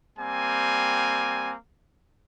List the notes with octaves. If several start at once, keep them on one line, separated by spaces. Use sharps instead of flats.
G3 A#3 C4 G#5